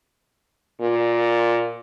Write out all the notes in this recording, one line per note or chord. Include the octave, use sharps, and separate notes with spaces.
A#2